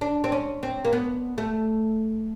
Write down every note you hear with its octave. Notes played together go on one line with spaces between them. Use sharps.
D4
C4
C#4
C4
A#3
B3
A3